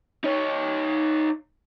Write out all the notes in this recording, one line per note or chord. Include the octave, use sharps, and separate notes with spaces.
D#4 C#5